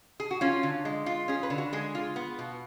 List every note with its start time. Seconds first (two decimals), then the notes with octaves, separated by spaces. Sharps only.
0.20 G#4
0.31 F#4
0.41 C#4 F4
0.63 D3
0.85 G#3
1.06 F4
1.28 C#4 G#4
1.43 B4
1.50 D3
1.58 F#4
1.73 G#3 G#4
1.95 F4
2.16 B3
2.39 B2